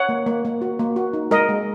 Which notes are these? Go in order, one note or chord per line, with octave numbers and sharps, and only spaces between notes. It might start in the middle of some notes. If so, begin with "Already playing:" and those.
Already playing: C#5 F#5
A#3
A#3
A#3
F#4
A#3
F#4
D#4
G#3 A#4 D#5
G#3